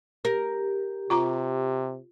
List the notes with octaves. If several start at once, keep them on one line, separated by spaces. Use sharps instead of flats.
G4 A#4
C3 F4 A#5 D6